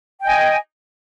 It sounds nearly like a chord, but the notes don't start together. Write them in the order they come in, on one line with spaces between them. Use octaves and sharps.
G5 D#5 G#5